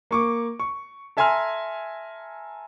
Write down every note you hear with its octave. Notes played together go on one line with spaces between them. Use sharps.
A#3 C#6 D6
C#6
A4 E5 G#5 A#5 C6 F6